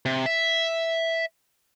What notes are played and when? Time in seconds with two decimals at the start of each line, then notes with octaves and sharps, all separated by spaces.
0.05 C3
0.26 E5